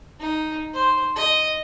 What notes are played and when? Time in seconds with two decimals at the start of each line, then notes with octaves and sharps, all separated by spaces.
0.20 D#4
0.74 C5
1.16 D#5